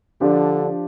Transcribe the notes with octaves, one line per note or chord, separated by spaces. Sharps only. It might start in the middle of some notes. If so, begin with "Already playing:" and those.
D3 F3 D4 G4